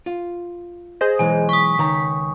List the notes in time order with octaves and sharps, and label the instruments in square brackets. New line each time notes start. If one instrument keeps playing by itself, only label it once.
[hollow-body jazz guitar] F4
[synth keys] G#4 C5 D#5
[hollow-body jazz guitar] B1 E3 G#3 [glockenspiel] G#5
[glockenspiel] C#6 D#6 [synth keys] B6
[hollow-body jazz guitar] C#2 D#3 A#5